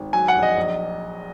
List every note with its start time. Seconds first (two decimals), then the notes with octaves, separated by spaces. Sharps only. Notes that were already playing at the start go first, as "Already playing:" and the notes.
Already playing: G#1
0.13 F#3 G#5
0.28 F#5
0.35 A#1
0.43 D#5
0.56 A#1